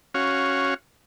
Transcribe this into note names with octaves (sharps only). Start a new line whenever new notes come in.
C#4 F#4 C#5 F5